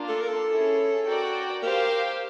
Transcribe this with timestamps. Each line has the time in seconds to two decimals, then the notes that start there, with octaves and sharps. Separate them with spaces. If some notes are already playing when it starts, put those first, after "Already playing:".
Already playing: A#3 D4 F4
0.09 A4
0.21 A#4
0.28 A4
0.47 C#4 E4 G#4 C#5
1.05 F#4 A#4 D5 G5
1.63 G4 A#4 C5 F5